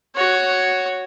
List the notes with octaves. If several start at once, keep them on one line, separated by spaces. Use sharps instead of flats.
F#4 C#5